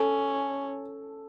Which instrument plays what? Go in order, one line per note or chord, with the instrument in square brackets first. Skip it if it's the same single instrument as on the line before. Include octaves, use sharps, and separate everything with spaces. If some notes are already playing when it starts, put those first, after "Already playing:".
Already playing: [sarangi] C#4 [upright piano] A4